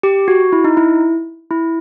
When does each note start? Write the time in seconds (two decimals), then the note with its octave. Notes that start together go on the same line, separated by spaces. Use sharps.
0.03 G4
0.28 F#4
0.53 E4
0.64 D#4
0.77 E4
1.51 E4